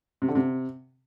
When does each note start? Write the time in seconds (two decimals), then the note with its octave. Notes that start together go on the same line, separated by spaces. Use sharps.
0.22 C3
0.28 D3
0.35 C3